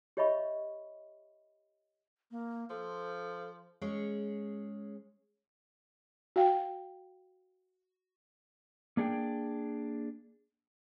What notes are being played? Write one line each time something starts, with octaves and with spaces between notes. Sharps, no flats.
G4 C#5 D#5 E5 B5 C#6
A#3
F3 A4
G#3 C#4 G#4 C#5
F#4 F5 G5
A#3 D4 G#4 F#5 G5